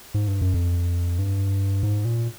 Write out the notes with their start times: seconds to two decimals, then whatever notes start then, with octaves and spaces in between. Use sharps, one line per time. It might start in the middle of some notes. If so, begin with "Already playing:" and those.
0.14 G#2
0.28 G2
0.41 F#2
0.54 F2
1.19 G2
1.83 G#2
2.05 A#2